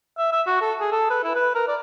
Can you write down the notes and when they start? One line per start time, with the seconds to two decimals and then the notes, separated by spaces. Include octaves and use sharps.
0.18 E5
0.32 E5
0.47 F#4
0.61 A4
0.81 G#4
0.92 A4
1.10 B4
1.24 E4
1.36 B4
1.55 A#4
1.68 D5